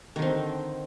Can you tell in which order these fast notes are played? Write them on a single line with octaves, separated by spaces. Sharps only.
D#3 D3 C4